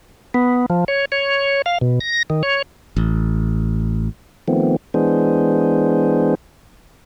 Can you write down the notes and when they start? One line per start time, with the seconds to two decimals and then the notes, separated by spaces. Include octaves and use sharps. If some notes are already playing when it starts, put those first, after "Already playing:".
0.34 B3
0.70 F3
0.88 C#5
1.12 C#5
1.66 F5
1.81 B2
2.00 A#6
2.30 D#3
2.43 C#5
2.97 A1
4.48 D#3 F3 A3 B3 C4
4.94 E3 G#3 B3 D4 G#4 C5